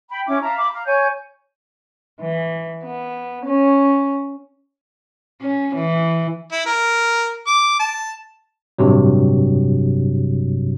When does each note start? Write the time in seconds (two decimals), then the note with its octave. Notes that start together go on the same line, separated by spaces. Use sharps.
0.10 G5 B5
0.27 C#4 E4 D6
0.42 E5 F5 A5 A#5
0.58 B5 D6
0.71 F5 A#5
0.86 C#5 G#5 G6
2.21 E3
2.84 B3
3.45 C#4
5.41 C#4
5.75 E3
6.52 E4
6.66 A#4
7.47 D6
7.79 A5
8.78 A1 G2 C3 F#3